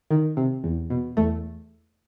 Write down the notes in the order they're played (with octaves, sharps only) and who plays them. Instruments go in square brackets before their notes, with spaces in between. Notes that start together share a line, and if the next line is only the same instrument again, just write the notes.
[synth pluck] D#3
C3
E2
B2
E2 A3